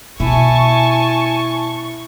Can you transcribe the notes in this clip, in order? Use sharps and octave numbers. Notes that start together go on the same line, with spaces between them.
B2 E4 G#5 A5 C#6